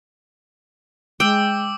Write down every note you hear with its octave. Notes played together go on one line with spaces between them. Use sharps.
G#3 G5 D6 E6